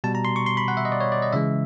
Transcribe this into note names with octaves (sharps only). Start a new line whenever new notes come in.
B2 G3 A5
A#5
C6
C#6
C6
B5
F#5
E5
D#5
D5
C#5
D5
D#5
C#3 E3 G#3 E5